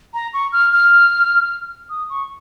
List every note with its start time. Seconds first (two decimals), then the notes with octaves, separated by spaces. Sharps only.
0.14 A#5
0.34 C#6
0.52 F6
0.73 F6
1.90 D#6
2.09 C#6